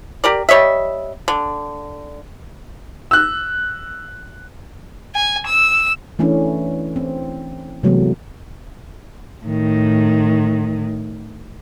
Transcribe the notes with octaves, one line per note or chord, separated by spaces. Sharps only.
G4 A#4 D5
G3 C#5 D#5 E5
D3
E6 F#6
G#5
E6
E3 A3 C#4 D4 E4
C4
C3 E3 F#3 G#3 A3 B3
A2 D#3